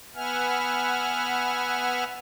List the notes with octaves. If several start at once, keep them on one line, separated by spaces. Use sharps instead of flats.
B3 B4 E5 F#5 G#5 F6